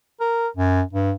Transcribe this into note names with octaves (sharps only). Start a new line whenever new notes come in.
A#4
F#2
G2